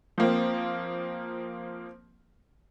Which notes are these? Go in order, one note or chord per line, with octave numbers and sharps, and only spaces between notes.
F3 A#3 C4